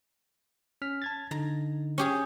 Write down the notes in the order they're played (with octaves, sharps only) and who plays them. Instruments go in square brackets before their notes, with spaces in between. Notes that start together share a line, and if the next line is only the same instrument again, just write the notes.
[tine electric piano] C#4 F6 B6
A5 G#6 A6
[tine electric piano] D3 D#4 [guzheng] A#5
[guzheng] C#4 G4 G#4